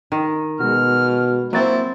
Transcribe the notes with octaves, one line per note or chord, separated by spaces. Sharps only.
D#3
B2 G#3 F#4 F6
F#3 A#3 C4 E4 A6